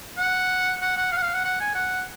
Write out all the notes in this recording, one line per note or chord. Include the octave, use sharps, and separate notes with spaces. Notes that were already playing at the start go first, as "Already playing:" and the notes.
F#5
F#5
F#5
F5
F#5
F5
F#5
F#5
G#5
F#5